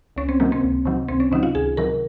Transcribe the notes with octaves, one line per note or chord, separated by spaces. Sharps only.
C#2 C#4
C4
C3 D#3 F#3 A#3
C4
C#2
C3 D#3 F#3
C#2 C4
C#4
C3 D#3 F#3 D#4
F4
C#2 G#4
C3 D#3 F#3 A#4